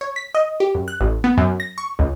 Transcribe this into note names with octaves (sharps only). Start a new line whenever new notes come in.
C#5
B6
D#5
G4
F#2
F#6
A1
B3
F#2
A#6
C#6
C#2